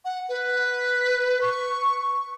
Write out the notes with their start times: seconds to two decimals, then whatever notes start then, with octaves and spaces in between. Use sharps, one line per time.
0.05 F#5
0.29 B4
1.41 C#6